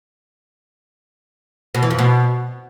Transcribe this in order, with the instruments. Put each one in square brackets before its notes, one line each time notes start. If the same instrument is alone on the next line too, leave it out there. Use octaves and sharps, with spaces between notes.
[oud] B2
E3
F2
B2